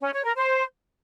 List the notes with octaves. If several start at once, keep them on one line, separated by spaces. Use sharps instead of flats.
C#4
C#5
A#4
C5